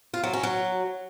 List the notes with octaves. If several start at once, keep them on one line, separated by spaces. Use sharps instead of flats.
F4
F#3
C#4
F#3